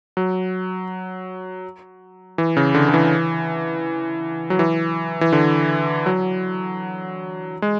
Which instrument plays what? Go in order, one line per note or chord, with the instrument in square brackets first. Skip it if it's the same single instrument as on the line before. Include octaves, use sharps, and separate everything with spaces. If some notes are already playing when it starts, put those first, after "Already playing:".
[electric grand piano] F#3
E3
C#3
D3
D3
E3
F#3
E3
E3
D3
F#3
G#3